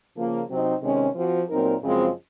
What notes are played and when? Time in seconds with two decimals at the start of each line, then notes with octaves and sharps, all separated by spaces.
0.15 C#3 F3 A#3 F4
0.49 C3 F#3 C4 D#4
0.82 C3 D#3 G#3 C#4
1.15 F3 C4 F#4
1.49 A#2 F#3 C4 D#4 A#4
1.83 F#2 C#3 F3 G#3 C4